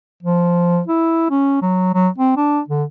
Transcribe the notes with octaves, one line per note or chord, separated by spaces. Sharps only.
F3
E4
C#4
F#3
F#3
C4
D4
D3